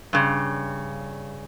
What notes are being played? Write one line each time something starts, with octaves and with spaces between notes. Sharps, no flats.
G2 C#3